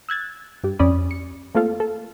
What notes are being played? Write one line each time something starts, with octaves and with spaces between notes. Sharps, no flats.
E6 F#6 G#6 A6
G2 G4
F2 C#4 D5 B5 D#6
C#7
A3 A#3 C4 F4 A4 F5
A4